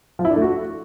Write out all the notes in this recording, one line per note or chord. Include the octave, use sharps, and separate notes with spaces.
F3
E4
D4
A3
F#4